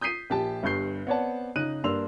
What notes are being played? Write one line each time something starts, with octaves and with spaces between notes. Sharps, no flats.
D#6 G6 B6 C7 D#7
A#1 G4 A5
G1 G2 C#6 G6 C7
B3 C4 C#5 D5 F#5 A5
C#3 D#4 F#6 D#7
G2 A#3 D4 C6 E6 F7